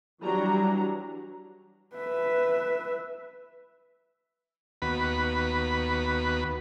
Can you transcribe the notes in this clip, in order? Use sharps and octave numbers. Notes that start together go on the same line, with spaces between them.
E3 F#3 G3 D4 F#4 A#5
B4 E5
D#2 B3 F#4 B4 B5